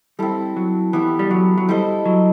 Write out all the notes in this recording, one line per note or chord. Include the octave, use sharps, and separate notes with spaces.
G3 C4 E4 A4
F#3
E3 B3 E4 G4
G3
F#3
F#3
G3 E4 A4 C5 D#5
F#3